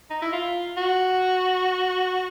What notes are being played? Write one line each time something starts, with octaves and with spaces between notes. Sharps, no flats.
D#4
E4
F4
F#4